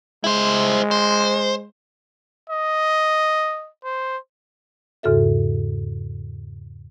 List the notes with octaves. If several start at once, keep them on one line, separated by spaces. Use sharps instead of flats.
G#3 E4 C5
C5
D#5
C5
E2 G#2 C#3 F#4 A4 E5